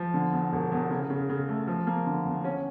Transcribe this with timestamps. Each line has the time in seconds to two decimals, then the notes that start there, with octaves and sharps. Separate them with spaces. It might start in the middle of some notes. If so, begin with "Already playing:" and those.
Already playing: F3
0.14 D3
0.32 E2
0.52 E1
0.72 E2
0.90 C#3
1.10 C#3
1.29 C#3
1.49 A3
1.68 F3
1.87 A#3
2.06 D3
2.25 E2
2.44 C#4